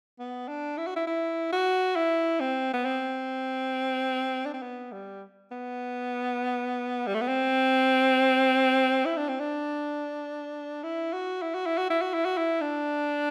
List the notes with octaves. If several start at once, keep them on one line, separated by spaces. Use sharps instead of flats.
B3
D4
E4
F#4
E4
E4
F#4
E4
C4
B3
C4
D4
C4
B3
G3
B3
G3
A3
B3
C4
E4
D4
C4
D4
E4
F#4
E4
F#4
E4
F#4
E4
F#4
E4
F#4
E4
D4